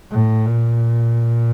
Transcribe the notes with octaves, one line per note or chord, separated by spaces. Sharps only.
A2
A#2